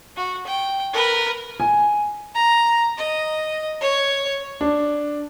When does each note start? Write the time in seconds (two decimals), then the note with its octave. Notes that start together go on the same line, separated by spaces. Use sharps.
0.17 F#4
0.47 G5
0.93 A#4 B4
1.60 G#5
2.35 A#5
2.97 D#5
3.81 C#5
4.61 D4